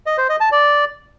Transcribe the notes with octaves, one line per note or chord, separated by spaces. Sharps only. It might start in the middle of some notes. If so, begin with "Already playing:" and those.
D#5
C5
D#5
A5
D5